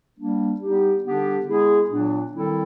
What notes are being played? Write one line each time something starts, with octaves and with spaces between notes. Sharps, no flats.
G3 A#3 D4
G3 B3 D#4 G4
D3 G3 B3 D4 G4
G#3 B3 E4 G#4
A#2 F#3 B3 D4
D#3 G3 C4 E4 A4